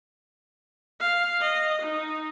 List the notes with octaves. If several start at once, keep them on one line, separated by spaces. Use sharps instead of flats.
F5
D#5
D#4